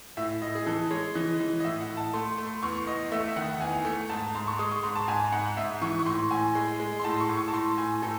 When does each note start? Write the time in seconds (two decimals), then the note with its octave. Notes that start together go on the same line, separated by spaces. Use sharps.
0.17 A2 E5
0.42 A2 D#5
0.55 G#4
0.66 E3 A4
0.91 G#3 C#5
1.15 E3 D#5
1.40 E3
1.60 D#5
1.64 A2 E5
1.80 F#5
1.89 A2
1.97 A5
2.13 A3 C6
2.38 A3
2.47 C6
2.63 E2 C#6
2.87 E2 D#5
3.12 A3 E5
3.28 E5
3.36 D#3 F#5
3.50 F#5
3.61 E2 G#5
3.85 A3
4.09 G#2 A5
4.34 G#2 C6
4.47 C#6
4.59 G#3 D#6
4.71 C#6
4.83 G#2 C6
4.95 A5
5.08 G#2 G#5
5.32 G#2 F#5
5.57 G#2 E5
5.82 E3 C#6
5.99 C#6
6.06 A2 C6
6.31 A2 G#5
6.55 G#3
6.80 G#3
6.99 C6
7.04 A2 A5
7.20 C#6
7.29 A2
7.37 C#6
7.48 A5
7.53 A2 C6
7.78 A2 G#5
8.02 A2 A4